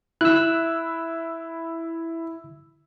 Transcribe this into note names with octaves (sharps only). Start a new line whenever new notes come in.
E4 E6 F#6